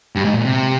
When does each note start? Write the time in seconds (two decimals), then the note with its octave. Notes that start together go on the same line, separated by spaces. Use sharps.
0.15 G2
0.25 G#2
0.35 A#2
0.44 C3